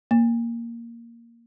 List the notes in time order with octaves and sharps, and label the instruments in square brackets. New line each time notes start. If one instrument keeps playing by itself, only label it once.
[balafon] A#3